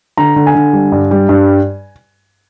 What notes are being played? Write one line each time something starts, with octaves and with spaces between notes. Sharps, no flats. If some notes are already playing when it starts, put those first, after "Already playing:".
D3 A#5
D3
G#5
D3
G3
G2
G3
G2